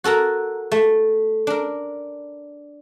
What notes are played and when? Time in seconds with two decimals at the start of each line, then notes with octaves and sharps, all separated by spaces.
0.04 F#4 A4 A#4 A#5
0.72 A3
1.47 D4 A#4